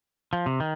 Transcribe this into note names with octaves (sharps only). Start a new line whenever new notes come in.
F3
C3
D#3